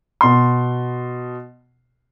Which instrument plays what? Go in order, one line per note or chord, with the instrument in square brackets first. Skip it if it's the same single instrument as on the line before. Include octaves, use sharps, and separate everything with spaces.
[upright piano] B2 C6